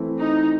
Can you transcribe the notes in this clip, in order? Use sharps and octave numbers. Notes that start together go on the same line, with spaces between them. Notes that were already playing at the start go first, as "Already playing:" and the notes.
Already playing: E3 A3 C4 E4
D#4